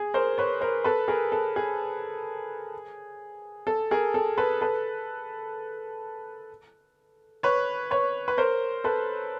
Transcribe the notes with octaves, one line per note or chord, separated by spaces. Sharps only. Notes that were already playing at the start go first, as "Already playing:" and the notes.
Already playing: G#4
A#4 C5
B4 C#5
A#4 C5
A4 B4
G#4 A#4
A4
G#4
A4
G#4 A#4
A4
A4 B4
A4 B4
B4 C#5
B4 C#5
B4
A#4 C5
A4 B4